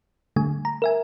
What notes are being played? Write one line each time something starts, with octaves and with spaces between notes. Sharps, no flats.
D3 G3 A3 G#5
A#5
A#4 E5 G#5